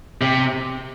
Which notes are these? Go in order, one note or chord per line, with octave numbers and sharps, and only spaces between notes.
C3